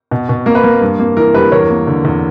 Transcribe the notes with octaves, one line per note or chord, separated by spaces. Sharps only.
B2
B2
A#3 A#4
B4
A#3 A#4
G2
A#3
E3 A#4
G2 G4 B4
E2 A#4 C#5
A#3
D3
E2